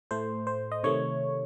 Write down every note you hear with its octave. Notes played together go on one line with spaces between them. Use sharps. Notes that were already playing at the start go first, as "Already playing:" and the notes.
A2 A3 C5
C5
D#5
C3 D#3 A3 C#5